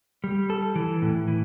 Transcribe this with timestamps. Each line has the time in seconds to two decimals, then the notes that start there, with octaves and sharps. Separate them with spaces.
0.24 G3
0.50 A4
0.76 E3
1.02 A2
1.28 E3